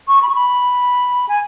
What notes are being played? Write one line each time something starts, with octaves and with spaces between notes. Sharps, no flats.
C#6
B5
C#6
B5
G#5